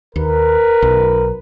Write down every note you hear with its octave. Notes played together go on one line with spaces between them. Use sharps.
D#2 A#4 B4
B1